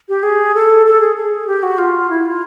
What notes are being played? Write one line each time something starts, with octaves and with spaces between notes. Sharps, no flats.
G4
G#4
A4
A4
G#4
G#4
G4
F#4
F4
E4
F4